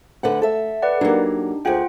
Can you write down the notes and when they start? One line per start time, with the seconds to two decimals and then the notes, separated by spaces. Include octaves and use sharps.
0.23 D3 A3 B4 F#5
0.42 A4 E5
0.82 B4 D5 F#5
1.01 F#3 A#3 D4 D#4 G4
1.65 D2 F4 G#4 F#5 G5